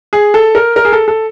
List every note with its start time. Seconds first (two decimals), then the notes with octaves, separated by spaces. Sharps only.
0.13 G#4
0.34 A4
0.55 A#4
0.76 A#4
0.85 G#4
0.92 A4
1.08 A4